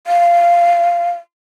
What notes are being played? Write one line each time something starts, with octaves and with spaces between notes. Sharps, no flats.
F5